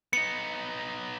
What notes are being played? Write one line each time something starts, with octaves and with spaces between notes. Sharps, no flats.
B3 D#4 C#7